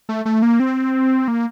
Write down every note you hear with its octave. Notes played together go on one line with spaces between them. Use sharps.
A3
A3
A#3
C4
A#3